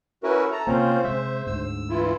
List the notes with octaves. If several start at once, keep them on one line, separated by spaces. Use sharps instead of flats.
C#4 E4 F#4 A#4 B4
A4 A#5
C3 A#3 C4 C#4 F4 C5
C3 G#3 E5
D2 G#2 E6
E3 E4 F4